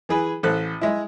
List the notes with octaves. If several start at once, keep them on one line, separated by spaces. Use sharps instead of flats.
E3 G#4 B4
A1 A4 C5 F#6
G#3 E4